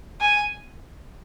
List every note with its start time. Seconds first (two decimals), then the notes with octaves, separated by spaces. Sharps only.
0.21 G#5